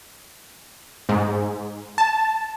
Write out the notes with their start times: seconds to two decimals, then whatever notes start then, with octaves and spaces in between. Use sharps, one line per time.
1.09 G#2
1.98 A5